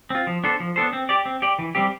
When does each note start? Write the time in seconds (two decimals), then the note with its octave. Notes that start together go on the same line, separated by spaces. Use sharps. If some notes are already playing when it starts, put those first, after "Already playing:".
0.10 C4 F4
0.27 F3
0.44 B3 D4 A4 C5
0.60 F3
0.76 B3 D4 A4 C5
0.93 C4
1.09 G4 D5
1.26 C4
1.42 G4 D5
1.59 E3
1.75 G3 C4 G4